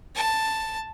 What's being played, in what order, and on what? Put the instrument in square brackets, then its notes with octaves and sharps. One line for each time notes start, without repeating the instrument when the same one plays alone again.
[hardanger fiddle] A5